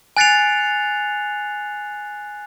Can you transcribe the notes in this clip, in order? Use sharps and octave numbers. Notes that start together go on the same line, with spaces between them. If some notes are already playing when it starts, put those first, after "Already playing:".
G#5 F#6 A6 C7 C#7 F7